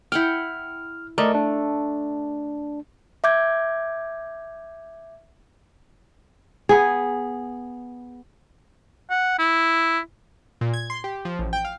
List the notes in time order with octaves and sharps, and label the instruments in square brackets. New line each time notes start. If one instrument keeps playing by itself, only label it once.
[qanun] E4 F#5 G5 [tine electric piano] F6
[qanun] A3 [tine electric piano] A#4 D5 D#5
[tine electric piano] D4
[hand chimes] E5 D6 G6 G#6
[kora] B3 G#4
[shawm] F#5
E4
[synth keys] A#2
G#6
C6
G4
F3
A1
G5
F5